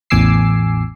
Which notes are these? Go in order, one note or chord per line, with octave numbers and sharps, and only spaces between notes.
A1 E2 G#5 D6 E6 C7